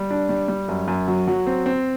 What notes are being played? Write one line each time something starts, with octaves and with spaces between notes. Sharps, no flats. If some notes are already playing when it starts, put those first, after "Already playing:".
Already playing: G3
D4
G3
G3
F#2
F#2
F#3
F#3
C4
C4